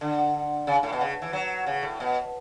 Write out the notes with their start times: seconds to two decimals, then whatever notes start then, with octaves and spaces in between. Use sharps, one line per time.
0.01 D3
0.67 C#3
0.83 A2
0.93 B2
1.01 C#3
1.22 E3
1.33 F#3
1.66 C#3
1.83 A2
2.00 B2